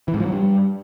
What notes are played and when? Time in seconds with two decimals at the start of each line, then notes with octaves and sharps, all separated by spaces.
0.08 E3
0.14 G#2
0.20 F3
0.26 F#3
0.32 G2